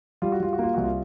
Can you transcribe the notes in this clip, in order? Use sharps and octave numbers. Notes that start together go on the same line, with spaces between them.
G3 F4
F#4
G3 F4
F#4
A#3 F4
C2 F#4
F4